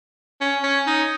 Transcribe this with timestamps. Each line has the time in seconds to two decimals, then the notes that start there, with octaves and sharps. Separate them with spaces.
0.41 C#4
0.64 C#4
0.87 D#4